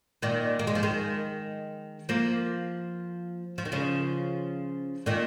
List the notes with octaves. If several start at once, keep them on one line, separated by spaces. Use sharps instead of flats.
A#2 D#3
A#3
G#3
F3
D#3 G#3
F3 A#3
F3
D#3
C#3 F3
A#2 D#3